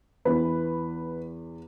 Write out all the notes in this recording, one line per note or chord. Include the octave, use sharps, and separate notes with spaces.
E2 E3 B4